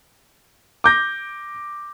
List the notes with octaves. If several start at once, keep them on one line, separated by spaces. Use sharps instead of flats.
D6 G6 A#6